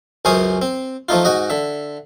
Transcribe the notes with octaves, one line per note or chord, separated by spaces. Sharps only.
C#2 F#2 C#4 C5 G#5 D#6
C4
F3 A3 D#4 F4
G#2 F#4 D#5
D3 E5